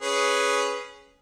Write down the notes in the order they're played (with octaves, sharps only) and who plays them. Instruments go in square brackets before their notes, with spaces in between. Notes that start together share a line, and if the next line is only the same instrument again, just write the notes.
[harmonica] C#4 G#4 B4